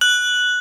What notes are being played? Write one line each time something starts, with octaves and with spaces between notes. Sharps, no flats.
F#6 F#7